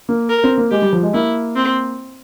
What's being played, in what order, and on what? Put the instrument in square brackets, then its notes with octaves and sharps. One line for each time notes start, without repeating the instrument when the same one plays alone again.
[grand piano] A#3
[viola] A#4
[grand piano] C4
A#3
[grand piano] G#3 [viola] G4
[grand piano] G3
F3
G#3
[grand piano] A#3 [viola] E4
[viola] C4